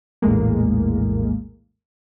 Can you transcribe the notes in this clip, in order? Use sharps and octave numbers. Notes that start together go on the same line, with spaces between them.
A#1 E2 A2 G#3 A#3